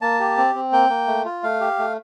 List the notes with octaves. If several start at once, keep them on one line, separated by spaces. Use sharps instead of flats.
A#3 A5
G4
C4
C4
A#3 G5
A#3
A3
F4
A3 F5
G4
A3